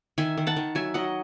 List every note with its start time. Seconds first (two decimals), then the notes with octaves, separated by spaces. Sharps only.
0.18 D#3 E5 G#5
0.37 D#3
0.47 F#5 A5
0.56 D#3
0.75 F#3 E5 G#5
0.94 F#3 D#5 F#5